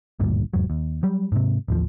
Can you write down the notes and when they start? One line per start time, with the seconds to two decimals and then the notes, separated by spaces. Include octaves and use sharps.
0.20 G#1 D2 G2 A#2
0.53 F1 E2 G#2 F#3
0.70 D#2
1.03 F#3 G3
1.32 G#2 C3
1.68 A1 D#2 F3